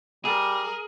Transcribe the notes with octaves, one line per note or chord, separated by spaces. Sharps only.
G3 G#4 A#4